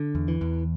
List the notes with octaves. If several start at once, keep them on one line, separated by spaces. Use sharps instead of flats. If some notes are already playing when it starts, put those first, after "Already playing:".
Already playing: D3
E2
E3
E2